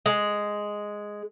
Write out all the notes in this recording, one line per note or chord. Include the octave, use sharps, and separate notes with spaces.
G#3